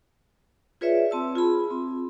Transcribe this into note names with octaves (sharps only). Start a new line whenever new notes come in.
F4 G#4 B4 C#5 D5 E5
C4 A5 E6
F4 G#4 B5
C4